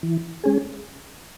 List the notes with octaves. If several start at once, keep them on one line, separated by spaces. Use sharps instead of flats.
E3
G#3 C#4 G#4